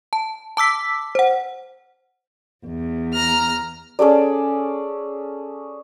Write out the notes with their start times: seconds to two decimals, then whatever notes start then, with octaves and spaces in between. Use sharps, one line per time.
0.13 A5
0.57 A5 D6 E6 B6
1.15 C5 F#5
2.65 E2
3.14 A#5 F6
3.99 C#4 G#4 A4 D5